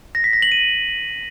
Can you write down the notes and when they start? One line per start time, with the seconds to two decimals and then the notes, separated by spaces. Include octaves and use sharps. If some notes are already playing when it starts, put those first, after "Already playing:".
0.15 A#6
0.24 B6
0.33 A#6
0.42 F#7
0.52 D#7